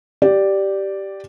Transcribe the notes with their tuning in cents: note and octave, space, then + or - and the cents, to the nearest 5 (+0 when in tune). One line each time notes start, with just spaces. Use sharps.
G4 -10 D5 +0